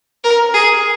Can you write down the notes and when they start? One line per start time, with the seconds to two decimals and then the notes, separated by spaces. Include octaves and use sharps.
0.24 A#4
0.54 G#4